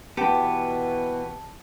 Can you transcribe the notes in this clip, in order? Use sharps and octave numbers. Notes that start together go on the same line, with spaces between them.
B2 E3 B3 G4 A5